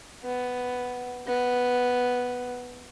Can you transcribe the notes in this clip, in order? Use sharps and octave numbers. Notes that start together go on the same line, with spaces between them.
B3
B3